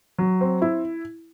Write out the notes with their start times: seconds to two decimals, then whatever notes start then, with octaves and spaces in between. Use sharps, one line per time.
0.18 F#3
0.41 C4
0.62 E4